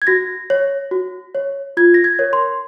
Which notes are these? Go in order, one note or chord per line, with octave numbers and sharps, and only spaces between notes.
G#6
F#4 A#6
C#5
F#4
C#5
F4 G#6
A#6
G#6
A#4 C#5
C6